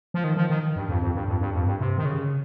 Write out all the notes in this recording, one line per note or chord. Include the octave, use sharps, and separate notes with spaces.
F3
D#3
F3
D#3
G2
F2
F2
G2
F2
G2
F2
G2
C3
D#3
C#3